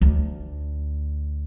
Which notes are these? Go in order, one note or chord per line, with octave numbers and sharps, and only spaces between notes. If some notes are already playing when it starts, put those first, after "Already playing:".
D2